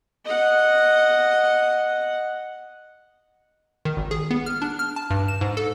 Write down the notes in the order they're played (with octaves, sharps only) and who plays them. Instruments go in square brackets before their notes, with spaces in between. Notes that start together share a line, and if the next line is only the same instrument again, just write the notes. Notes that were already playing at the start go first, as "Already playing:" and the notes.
[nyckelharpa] D#5 F#5
[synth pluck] D#3
G#1
G#4
B3
F6
D4
F6
A5
G2
E7
G#2
A4